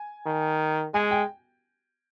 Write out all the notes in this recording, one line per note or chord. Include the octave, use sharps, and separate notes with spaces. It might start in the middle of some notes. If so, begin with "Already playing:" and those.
Already playing: G#5
D#3
G#3 G#5
G5